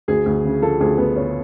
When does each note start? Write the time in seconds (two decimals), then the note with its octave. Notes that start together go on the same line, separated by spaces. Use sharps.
0.08 D2 G#4
0.26 D2
0.44 C#3
0.62 F3 A4
0.80 D2 G#4
0.98 D2 B3
1.16 C#3 C#4